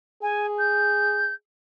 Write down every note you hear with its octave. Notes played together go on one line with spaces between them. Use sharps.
G#4 G#5
G6